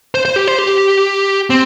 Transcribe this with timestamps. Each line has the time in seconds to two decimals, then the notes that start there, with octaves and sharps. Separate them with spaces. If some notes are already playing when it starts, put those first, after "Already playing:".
0.15 C5
0.25 C5
0.36 G4
0.48 C5
0.59 G4
1.50 C4